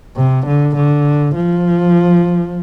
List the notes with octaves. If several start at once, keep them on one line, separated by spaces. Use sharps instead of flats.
C3
D3
D3
F3